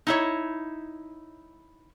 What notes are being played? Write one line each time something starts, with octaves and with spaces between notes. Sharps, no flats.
D#4 E4 C#5